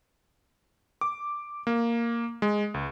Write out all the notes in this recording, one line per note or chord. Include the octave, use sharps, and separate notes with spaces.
D6
A#3
G#3
C#2